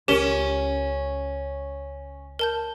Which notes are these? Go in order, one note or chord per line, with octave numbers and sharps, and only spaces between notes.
C#2 C#4 G4 A#4
A#4 A5 G6